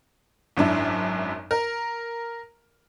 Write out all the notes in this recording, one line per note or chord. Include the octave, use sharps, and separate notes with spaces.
G#1 F#2 D4 E4
A#4